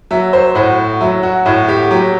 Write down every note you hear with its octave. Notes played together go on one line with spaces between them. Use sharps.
F#3 E5
C5
A2 F#4
F#3 E4
F#4
A2 F#4
G4
F#3 G4